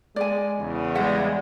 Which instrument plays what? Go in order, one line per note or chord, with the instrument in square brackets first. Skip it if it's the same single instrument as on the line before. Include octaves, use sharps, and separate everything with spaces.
[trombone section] G#3 [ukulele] D5 G#5
[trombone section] E2 C#3
[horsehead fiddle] G3 G#3 [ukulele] E5 F#5